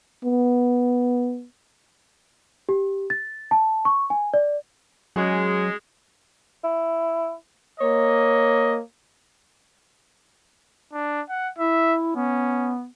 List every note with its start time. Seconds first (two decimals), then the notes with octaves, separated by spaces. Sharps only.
0.24 B3
2.69 G4
3.10 A6
3.51 A5
3.85 C#6
4.10 G#5
4.34 D5
5.16 F#3 G#3 C#4 F#4 G#4
6.64 E4
7.80 A#3 C#5 D#5
10.93 D4
11.29 F#5
11.59 E4 E5
12.15 B3 C#4